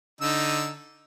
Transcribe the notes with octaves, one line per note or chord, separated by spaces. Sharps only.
D3 D#4 E6